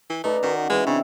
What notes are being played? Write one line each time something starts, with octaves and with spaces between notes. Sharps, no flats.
E3
A3 D#4 B4 D5 A#5
D#3 C#4 F#4
E3 G#3 C#4 B4
C#3 C4 D4